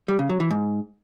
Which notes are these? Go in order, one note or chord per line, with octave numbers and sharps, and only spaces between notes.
G3
C#3
F#3
E3
G#2